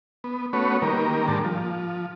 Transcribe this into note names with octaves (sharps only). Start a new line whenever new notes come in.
B3
A3 B3 C#4 F#4 B4 C#5
D#3 G3 A#3 A#4
G#2 G3 A#3 D4 A5
F3